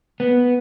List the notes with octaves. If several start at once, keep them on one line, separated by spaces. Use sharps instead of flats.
B3